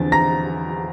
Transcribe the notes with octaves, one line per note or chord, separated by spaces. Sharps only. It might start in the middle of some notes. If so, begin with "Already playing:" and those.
Already playing: E2 D3 F3 C4 A6
A#5 A#6